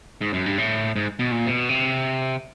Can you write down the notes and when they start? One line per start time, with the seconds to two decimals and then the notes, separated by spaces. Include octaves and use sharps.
0.21 G#2
0.33 F#2
0.46 G2
0.58 A2
0.96 G#2
1.19 B2
1.31 A#2
1.46 C3
1.50 B2
1.69 C3